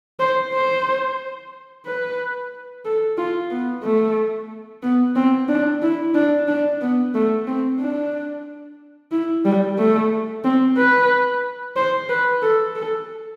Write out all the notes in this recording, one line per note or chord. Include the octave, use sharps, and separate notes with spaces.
C5
C5
B4
A4
F4
B3
A3
B3
C4
D4
E4
D4
D4
B3
A3
C4
D4
E4
G3
A3
C4
B4
C5
B4
A4
A4